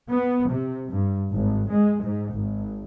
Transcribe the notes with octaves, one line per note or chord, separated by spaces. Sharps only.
B3
C3
G2
G#1
G#3
G#2
G#1